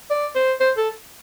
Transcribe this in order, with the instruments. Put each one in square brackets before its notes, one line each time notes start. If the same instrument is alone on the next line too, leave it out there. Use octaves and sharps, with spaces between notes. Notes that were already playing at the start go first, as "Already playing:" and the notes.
[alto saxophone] D5
C5
C5
A4